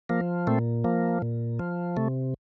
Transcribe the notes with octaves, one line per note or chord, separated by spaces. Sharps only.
F3 A#3
A#2 A3 C4
F3 A#3
A#2
F3
C3 A3